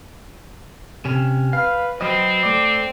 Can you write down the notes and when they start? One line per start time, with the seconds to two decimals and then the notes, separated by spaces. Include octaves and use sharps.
1.05 C3 C#4
1.53 B4 F5
2.01 F#3 C4 B4 D#5
2.43 A3 D5